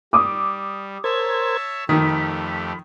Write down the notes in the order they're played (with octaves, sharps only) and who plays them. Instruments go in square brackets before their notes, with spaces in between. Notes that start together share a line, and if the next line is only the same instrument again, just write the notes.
[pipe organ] G3 [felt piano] D6 D#6
[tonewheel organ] A#4 C5 G#6 [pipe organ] C#5 E5 A5
[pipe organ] F2 A3 G4 [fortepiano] D#3 [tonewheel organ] B5